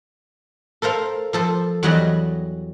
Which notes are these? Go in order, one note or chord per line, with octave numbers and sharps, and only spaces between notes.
A4 A#4 C5 F5
F3 A4 C5
E2 F#3 G3 F#4 D#5